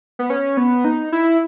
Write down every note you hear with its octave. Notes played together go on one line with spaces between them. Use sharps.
B3
C#4
B3
D#4
E4